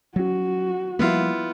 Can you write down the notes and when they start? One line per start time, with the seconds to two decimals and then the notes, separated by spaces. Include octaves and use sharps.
0.16 F#3 C#4 F#4
0.99 F3 G3 A#3 B3 E4 F4